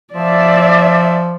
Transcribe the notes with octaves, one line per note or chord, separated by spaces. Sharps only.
F3 D5 E5